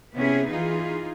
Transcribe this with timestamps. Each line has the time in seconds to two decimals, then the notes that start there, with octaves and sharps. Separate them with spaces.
0.14 C3 B3 C#4 E4 G#4
0.51 E3 D#4 F4 G#4